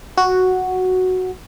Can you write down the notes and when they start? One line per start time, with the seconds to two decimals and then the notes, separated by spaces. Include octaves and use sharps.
0.18 F#4